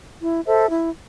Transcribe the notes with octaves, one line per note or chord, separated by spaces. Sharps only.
E4
A4 C5 E5
E4